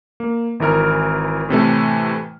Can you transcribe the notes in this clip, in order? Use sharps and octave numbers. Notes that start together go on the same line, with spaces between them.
A#3
G#1 E3 A#4 F6
A2 C3 E3 A3